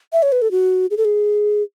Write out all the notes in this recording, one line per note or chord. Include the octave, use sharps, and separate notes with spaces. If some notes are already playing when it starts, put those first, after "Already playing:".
E5
C#5
B4
A4
F#4
G#4
A4
G#4